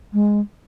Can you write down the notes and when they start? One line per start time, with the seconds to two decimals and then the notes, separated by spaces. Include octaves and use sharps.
0.13 G#3